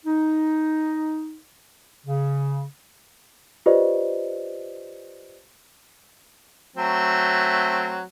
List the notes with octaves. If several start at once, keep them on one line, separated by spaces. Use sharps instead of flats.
D#4
C#3
F4 G4 B4 C5 D5 D#5
F#3 A3 C4